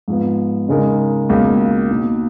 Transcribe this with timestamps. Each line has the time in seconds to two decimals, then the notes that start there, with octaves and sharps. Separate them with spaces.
0.08 G#2 F3 B3
0.68 C#3 G#3 D#4 A#4
1.29 C#2 B2 A#3
1.90 B2 A#3 D#4